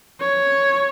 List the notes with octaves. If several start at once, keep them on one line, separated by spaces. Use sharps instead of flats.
C#5